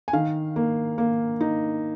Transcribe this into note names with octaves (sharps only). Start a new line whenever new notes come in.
G#5
D#3 F5
A#3
A#3
D#4